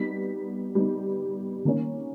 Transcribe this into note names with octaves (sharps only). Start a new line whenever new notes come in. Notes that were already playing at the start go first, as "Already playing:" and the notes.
Already playing: G3 B3 D#4 B6
G3 B3 D#4
D#3 A#3 C#4